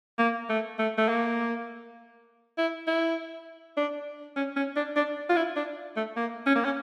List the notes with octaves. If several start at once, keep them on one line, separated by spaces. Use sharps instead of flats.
A#3
A3
A3
A3
A#3
E4
E4
D4
C#4
C#4
D4
D4
F4
E4
D4
A3
A#3
C#4
A#3
C#4